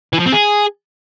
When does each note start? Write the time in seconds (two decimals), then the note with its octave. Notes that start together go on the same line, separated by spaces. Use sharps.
0.13 E3
0.19 F3
0.26 C4
0.32 G#4